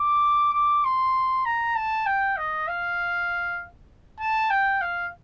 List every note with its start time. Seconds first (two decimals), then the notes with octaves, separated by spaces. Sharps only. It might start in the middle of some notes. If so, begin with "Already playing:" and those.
Already playing: D6
0.54 D6
0.85 C6
1.45 A#5
1.76 A5
2.06 G5
2.37 D#5
2.68 F5
4.20 A5
4.51 G5
4.82 F5